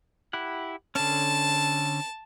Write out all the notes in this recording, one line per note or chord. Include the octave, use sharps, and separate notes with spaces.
E4 G4 F#5
D3 C#4 A5